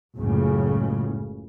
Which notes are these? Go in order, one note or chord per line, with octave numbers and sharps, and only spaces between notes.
F#1 C#2 A2 C#3